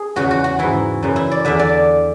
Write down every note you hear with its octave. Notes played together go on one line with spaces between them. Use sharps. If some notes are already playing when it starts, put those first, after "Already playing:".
Already playing: G#4
E2 C#3 E3 F#4
F#4
F#4
G#2 E3 E4
F#2 C#3 E3
E4
D5
E2 D3 E5
D5